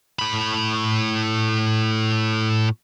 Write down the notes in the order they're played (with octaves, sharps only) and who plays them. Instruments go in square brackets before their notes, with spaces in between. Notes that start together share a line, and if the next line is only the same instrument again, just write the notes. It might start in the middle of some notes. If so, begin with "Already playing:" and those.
[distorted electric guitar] A2 B5